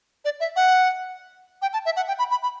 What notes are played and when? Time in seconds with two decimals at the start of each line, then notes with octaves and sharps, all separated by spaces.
0.25 D5
0.40 E5
0.56 F#5
1.62 G5
1.73 A5
1.85 E5
1.96 F#5
2.08 G5
2.19 B5
2.31 B5
2.43 B5